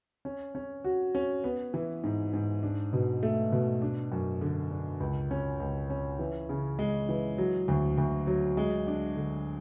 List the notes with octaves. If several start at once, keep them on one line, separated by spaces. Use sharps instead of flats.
C#4
C#4
F#4
C#4
B3
E3
G#2
G#2
D4
B2
A3
B2
D4
F#2
D3
D4
C#2
C#4
C#2
C#4
E3
C#3
G#3
E3
F#3
D2
D2
F#3
G#3
D4
D3